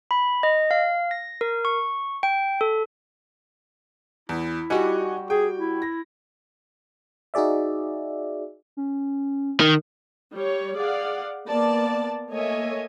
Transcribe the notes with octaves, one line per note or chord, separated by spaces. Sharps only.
B5
D#5
F5
A#6
A#4
C#6
G5
A4
E2 E4
G3 D#4 F#4 G4 F#5 G#5
G#4 G5
E4
A#6
D#4 F#4 G#4 D5 E5
C#4
D#3 A#4
G3 C#5
G#4 D5 F5 F#5
A#3 B3 D5 A5
A3 A#3 C#5 D#5 E5 G#5